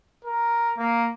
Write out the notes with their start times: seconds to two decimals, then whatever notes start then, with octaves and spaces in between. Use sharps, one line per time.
0.25 A#4
0.77 A#3